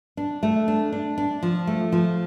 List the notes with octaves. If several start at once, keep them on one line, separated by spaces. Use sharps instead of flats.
D4
A3
D4
D4
D4
F3
A3
F3